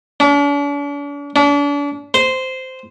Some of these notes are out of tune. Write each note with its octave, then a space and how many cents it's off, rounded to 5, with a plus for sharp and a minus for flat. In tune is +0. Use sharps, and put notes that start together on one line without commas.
D4 -45
D4 -40
C5 -10